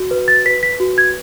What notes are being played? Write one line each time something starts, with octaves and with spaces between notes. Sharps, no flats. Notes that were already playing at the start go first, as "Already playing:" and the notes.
Already playing: F#4
B4
A6
B4 B6
B6
F#4
G#6